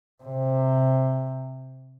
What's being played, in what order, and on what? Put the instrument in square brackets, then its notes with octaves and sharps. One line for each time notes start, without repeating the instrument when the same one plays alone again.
[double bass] C3